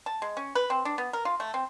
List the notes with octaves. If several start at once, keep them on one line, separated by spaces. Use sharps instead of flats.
A5
G#3
C#4
B4
C4
D4
B3
A#4
F4
A3
C4